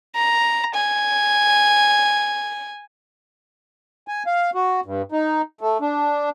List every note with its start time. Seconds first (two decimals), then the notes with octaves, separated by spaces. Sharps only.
0.16 A#5
0.74 G#5
4.08 G#5
4.27 F5
4.55 F#4
4.85 G2
5.12 D#4
5.61 A3
5.81 D4